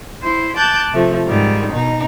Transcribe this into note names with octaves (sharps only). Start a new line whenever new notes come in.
E4 C5
A5 D6 F#6 G6 A6
C3 F3 A3
G#2 D#3 G3
B2 D#4